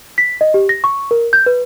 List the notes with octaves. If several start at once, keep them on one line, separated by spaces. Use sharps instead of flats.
B6
D#5
G4
A#6
C#6
A#4
G6
B4